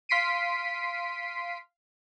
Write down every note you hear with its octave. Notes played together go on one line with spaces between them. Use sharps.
F5 C6 B6 C7 D7 D#7